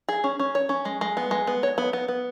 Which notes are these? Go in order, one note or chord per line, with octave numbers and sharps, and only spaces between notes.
G#4
C#4
C#4
C#5
C#4
G#3
G#3
B3
G#3
B3
C#5
B3
B3
B3